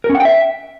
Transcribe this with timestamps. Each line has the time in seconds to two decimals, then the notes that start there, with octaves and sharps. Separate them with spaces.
0.04 A#4
0.09 C#4
0.15 F#5
0.20 G5
0.25 E5